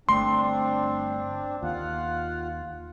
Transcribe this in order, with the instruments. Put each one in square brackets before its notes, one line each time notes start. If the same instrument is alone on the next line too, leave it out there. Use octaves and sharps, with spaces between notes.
[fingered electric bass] G1 A3 [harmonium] C4 D4 [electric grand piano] C6
[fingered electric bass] D#2 [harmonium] F4 F#5